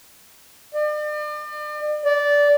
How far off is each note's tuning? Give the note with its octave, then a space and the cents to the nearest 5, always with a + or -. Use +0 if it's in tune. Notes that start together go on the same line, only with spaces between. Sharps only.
D5 +40
D5 -15